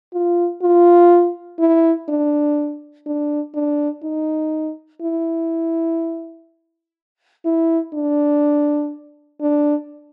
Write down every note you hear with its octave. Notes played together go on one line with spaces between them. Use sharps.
F4
F4
E4
D4
D4
D4
D#4
E4
E4
D4
D4